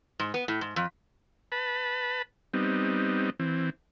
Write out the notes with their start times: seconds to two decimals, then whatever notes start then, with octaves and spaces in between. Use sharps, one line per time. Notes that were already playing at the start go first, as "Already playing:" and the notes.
0.19 G#2
0.34 B3
0.48 A2
0.61 G#2
0.76 F2
1.52 B4 A5 B5
2.54 G3 B3 C4 D#4
3.40 E3 C4